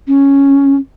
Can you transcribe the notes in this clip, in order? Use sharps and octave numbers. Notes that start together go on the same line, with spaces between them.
C#4